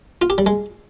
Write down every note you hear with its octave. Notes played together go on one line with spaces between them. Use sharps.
F4
G4
G3
G#3